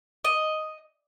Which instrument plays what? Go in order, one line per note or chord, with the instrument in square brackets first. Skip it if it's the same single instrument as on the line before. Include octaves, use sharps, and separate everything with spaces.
[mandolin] D#5